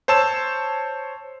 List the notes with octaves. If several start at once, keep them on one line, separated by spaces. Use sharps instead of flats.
C5 C#5 A5 E6 E7